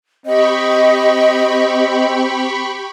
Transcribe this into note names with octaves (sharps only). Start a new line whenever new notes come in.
C4 G4 D#5 B5 C#6